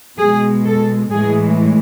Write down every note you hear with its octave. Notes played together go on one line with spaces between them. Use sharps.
B2 G#3 G#4
A4
A2 E3 G#3 G#4